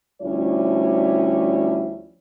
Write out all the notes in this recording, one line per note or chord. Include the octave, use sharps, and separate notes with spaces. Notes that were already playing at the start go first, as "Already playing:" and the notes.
D2 F3 G3 C#4 E4 C#5